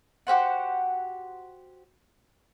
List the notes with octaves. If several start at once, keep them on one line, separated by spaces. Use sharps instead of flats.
F#4 G4 C5 F#5